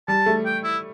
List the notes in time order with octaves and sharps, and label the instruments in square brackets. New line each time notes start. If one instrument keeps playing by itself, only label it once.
[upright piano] G3 [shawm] A5
[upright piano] A3
[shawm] G5
E4